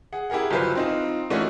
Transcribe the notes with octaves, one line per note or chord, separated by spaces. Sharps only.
G#4 F#5
E4 G4 G#4 A#4 F#5
G1 F#3 F4 B4 C5
C4 D#4 F4
E3 A3 C#4 D#4 F4 F#4